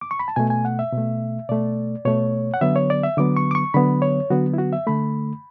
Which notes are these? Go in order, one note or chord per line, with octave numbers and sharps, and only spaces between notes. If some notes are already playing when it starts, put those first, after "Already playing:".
D6
C#6
B5
A5
B2 A3 G#5
G#5
F#5
E5
B2 A3
B2 A3 D5
B2 A3 C#5
F#5
D3 F#3 B3 E5
C#5
D5
E5
D3 F#3 B3 D6
C#6
D6
C#6
D3 F#3 B3 B5
C#5
D3 F#3 B3 F#4
E4
F#4
E5
D3 A3 B5